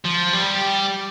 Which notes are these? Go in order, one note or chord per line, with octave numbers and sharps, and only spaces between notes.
F3
G3